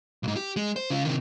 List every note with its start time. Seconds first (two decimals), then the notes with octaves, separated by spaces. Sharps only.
0.23 B1 G#2
0.36 G4
0.56 G#3
0.76 C5
0.90 C#3 F4
1.05 C3 D#3